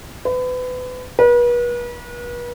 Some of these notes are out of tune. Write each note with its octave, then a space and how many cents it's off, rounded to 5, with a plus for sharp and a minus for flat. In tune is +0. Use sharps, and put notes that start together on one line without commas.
B4 +30
B4 -40